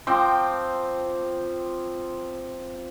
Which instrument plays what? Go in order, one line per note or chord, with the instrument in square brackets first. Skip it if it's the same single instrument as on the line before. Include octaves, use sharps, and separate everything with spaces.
[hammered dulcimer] F3 C4 G5 D6